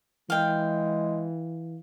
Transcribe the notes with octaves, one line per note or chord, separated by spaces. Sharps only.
E3 G#3 F5 G5